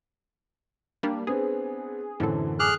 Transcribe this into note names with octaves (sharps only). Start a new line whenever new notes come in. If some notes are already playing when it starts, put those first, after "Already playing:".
G3 A#3 D4
B3 C4 D4 G#4
F#2 A2 D3 E3 C4 A4
G#4 D6 F6 F#6